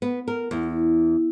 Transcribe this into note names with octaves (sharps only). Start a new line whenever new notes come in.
B3
A#4
E2